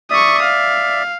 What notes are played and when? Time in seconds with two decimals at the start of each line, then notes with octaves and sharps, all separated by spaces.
0.11 D5 E5 C#6 D#6
0.43 F5